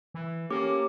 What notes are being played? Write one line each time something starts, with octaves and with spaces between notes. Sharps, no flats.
E3
A#3 C#4 G4 A4 D6